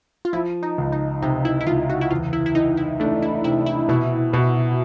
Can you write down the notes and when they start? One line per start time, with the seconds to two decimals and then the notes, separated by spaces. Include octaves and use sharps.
0.25 F4
0.33 F3 E4
0.63 D#4
0.78 C#2
0.92 D#4
1.22 C3 D#4
1.45 E4
1.61 E4
1.67 C#2 F4
1.89 F#4
2.01 E4
2.11 E2 F4
2.33 E4
2.46 E4
2.55 E3 D#4
2.77 E4
3.00 A3 D4
3.22 E4
3.44 C3 E4
3.66 E4
3.89 B2 E4
4.33 B2 F#4